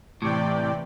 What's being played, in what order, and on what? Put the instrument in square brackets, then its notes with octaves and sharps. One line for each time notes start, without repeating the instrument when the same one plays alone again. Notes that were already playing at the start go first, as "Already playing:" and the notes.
[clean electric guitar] A2 [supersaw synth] C3 D5 G5 [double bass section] E3